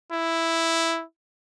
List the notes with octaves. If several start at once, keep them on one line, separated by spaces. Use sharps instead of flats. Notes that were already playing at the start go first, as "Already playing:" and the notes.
E4